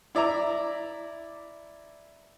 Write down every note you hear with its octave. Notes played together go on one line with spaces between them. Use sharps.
E4 D5 E5 A#5